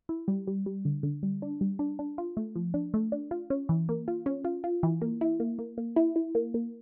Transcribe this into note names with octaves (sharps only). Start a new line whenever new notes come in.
E4
G3
G3
G3
D3
D3
G3
D4
G3
D4
D4
F4
A3
F3
D4
A3
D4
F4
C#4
E3
A#3
F4
C#4
F4
F4
E3
A#3
E4
A#3
A#3
A#3
E4
E4
A#3
A#3